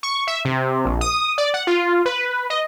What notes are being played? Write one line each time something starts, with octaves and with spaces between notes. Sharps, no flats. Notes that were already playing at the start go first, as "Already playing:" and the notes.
C#6
E5
C3
A#1
D#6
D5
F#5
F4
B4
D#5